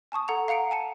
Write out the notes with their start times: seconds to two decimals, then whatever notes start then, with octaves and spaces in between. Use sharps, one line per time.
0.12 G#5 A5 C#6 D#6
0.28 A4 F#5 A#5 F7
0.48 F5 F#5 A#5 C#7 D7
0.71 G#5 A5 C#7